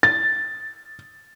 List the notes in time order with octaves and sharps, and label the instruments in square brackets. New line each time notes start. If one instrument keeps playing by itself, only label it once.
[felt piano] A6